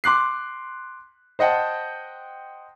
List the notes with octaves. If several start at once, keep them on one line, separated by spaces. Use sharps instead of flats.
C6 D6 F#6 C7
C5 D#5 F#5 G5 A5